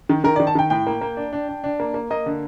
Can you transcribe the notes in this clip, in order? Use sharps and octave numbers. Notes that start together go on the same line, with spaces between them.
D#3
D#3 A#4
D5
D#3
A5
D#3 G5
A2 G5
A#3
A#3
D4
D4
D4
D4
A#3
A#3
A#3 D#5
D3